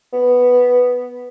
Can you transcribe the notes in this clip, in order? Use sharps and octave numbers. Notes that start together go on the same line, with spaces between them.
B3